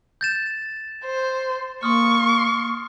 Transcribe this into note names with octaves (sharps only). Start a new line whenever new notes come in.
G6 A6 E7
C5
A#3 C6 C#6 D#6 F6